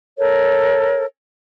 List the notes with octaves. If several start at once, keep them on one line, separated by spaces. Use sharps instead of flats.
A4 A#4 C#5